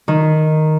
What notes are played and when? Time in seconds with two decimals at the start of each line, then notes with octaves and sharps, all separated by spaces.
0.08 D#3